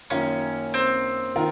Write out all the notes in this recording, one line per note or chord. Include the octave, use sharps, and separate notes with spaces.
F#2 D#3 A#3 C#4 F4
C4
D#3 F4 A#4